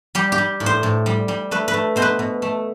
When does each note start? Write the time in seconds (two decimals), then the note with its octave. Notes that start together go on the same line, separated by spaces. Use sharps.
0.15 G3 G4
0.32 G4
0.38 G3
0.60 A2
0.66 C5
0.83 A2
1.06 G3
1.28 G3
1.51 A3 B4
1.68 B4
1.74 A3
1.96 B2 C5
2.02 B4
2.19 B2
2.42 A3